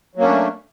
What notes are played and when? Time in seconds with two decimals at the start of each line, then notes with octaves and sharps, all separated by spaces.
0.15 F#3
0.19 A#3
0.22 C#4
0.25 D4
0.29 A3